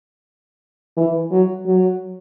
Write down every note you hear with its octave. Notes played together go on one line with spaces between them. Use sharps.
E3
F#3
F#3